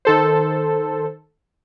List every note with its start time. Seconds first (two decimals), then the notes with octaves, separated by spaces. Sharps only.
0.05 D#3 A4 C5